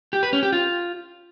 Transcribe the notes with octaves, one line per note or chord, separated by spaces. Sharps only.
G4
B4
C#4
G4
F4